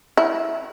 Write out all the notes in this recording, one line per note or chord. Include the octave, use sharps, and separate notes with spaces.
E4